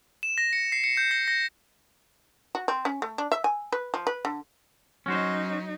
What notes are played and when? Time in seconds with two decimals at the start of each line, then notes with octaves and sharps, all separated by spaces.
0.23 E7
0.38 A#6
0.53 C#7
0.72 C7
0.84 C#7
0.97 G6
1.11 A#6
1.28 A#6
2.55 F#4
2.68 C4
2.85 C#4
3.02 A3
3.18 D4
3.32 E5
3.44 G#5
3.72 B4
3.94 F3
4.07 B4
4.25 D3
5.06 F#3 C#4 D#4 F#4 C5